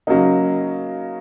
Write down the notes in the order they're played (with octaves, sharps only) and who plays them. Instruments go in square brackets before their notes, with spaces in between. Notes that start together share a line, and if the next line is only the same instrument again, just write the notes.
[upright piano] C#3 F#3 A#3 D#4